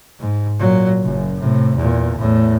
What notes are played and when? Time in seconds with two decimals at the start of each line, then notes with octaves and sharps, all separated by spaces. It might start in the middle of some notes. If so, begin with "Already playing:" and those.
0.20 G#2
0.60 A#2 F#3
1.03 F#1 F#2
1.40 A2 C3
1.76 E2 A#2
2.19 E2 A2